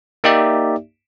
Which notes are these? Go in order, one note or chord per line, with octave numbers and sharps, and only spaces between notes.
A#3 D#4 G4 D5 E5